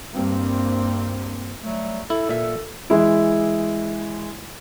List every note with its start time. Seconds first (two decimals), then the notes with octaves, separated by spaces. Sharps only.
0.12 G2 A#3 C4
1.63 F#3 G3 A3
2.10 E4 A4
2.29 A#2 E5
2.90 E3 G#3 E4